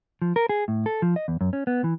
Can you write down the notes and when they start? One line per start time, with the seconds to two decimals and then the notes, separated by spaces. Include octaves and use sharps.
0.22 F3
0.36 A#4
0.49 G#4
0.68 A2
0.86 A4
1.02 F3
1.16 D#5
1.28 E2
1.41 F#2
1.53 C#4
1.67 B3
1.84 E3